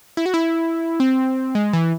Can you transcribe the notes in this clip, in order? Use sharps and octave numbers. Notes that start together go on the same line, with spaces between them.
E4
F#4
E4
C4
G#3
E3